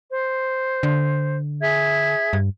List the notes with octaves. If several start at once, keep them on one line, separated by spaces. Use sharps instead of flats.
C5
D3
G#4 E5 G#6
G2